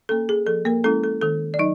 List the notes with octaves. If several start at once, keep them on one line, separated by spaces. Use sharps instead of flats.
A#3 C#4 A4
G#4
F3 A4
A#3 A#4
G#3 C#4 E4 A4
A4
D#3 A4
D5
F#3 D#4 D#5